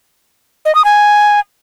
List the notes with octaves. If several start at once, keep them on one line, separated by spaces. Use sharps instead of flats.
D#5
D#6
G#5